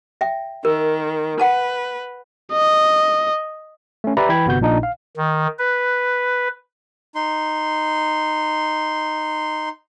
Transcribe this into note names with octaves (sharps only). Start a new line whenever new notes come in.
E5 G5
D#3 A#4
B4 F#5 A5
D#5
A3 C#4
G4 B4 D5 E5 A#5 B5
E3 G5 B5 G#6
G1 C3 B3 F#4 G6
A#1 A#2 D4 D#4
F5
D#3
B4
D#4 C6